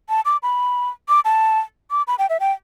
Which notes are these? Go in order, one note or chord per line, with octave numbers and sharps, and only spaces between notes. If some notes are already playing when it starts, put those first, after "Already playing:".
A5
D6
B5
D6
A5
D6
B5
G5
E5
G5